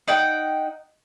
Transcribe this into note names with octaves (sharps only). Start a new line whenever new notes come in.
D#4 F#5 G5